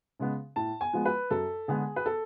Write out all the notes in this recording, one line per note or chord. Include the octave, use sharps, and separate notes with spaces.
C#3 G#3 B3
A2 A5
G#5
F3 G#3 B3
B4
F#2 A4
D3 G#3 B3 G#4
B4
A4